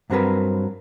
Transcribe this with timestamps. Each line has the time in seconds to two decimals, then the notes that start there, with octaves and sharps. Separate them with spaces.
0.10 G2 F#3 C4 G4 A#4 B4